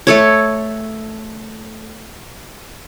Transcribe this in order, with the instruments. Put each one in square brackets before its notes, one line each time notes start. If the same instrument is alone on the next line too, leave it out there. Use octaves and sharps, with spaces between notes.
[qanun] A3 A4 C#5